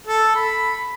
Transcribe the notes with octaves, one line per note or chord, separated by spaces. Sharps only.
A4
B5